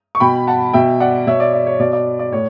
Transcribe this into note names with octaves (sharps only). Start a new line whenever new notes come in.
C#6
B2 G5 B5
F#5 A5
B2 E5 G5
D5 F#5
B2 C#5 E5
D5
D5
C#5
B2 D5
D5
D5
A2 C#5